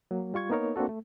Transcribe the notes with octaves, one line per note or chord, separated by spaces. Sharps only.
F#3 A#3
G3 F4 C#6 G#6
A#3 B3 D#4 A#4 C#5
A#3 C4 D4 F#4 A4
A3